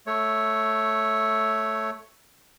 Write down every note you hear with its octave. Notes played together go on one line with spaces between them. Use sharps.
A3 C#5